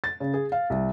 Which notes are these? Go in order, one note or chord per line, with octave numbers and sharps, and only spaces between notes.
A6
C#3
G#4
F5
C2